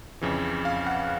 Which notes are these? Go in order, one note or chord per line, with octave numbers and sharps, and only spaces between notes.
F2 C#3 E3
F5
F#5